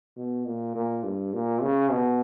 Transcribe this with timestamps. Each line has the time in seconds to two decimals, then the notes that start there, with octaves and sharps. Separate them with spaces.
0.17 B2
0.46 A#2
0.76 A#2
1.04 G2
1.34 A#2
1.62 C#3
1.91 B2